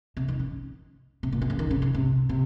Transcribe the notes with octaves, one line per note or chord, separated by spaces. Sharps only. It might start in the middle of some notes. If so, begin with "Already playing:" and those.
C3
D#3
C#3
C3
A#2
C3
C#3
D#3
C#3
C#3
C3
C3